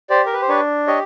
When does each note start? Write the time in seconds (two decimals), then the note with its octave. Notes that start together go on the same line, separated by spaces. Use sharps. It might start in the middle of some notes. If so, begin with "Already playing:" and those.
0.10 G4 C5 D5
0.26 A#4
0.33 B4
0.42 C5
0.49 D4 B4 C#5
0.87 G4 C#5 D#5